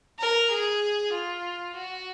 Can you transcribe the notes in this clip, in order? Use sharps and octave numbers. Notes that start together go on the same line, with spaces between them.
A#4
G#4
F4
F#4